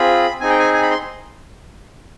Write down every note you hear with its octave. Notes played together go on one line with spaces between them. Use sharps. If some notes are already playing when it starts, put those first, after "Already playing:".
Already playing: C4 F4 G#4 B5
C4 D#4 G#4 G#5
G5
G#5
G#5
B5
C6